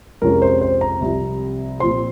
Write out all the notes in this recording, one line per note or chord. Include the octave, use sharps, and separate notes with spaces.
F2 C3 F3 G#3 C#4 A#4
C5
C5
A#5
C2 C3 F3
A#2 F3 C4 C6